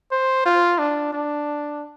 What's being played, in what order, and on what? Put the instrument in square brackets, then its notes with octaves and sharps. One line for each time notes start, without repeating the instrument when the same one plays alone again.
[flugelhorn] C5
F4
D4
D4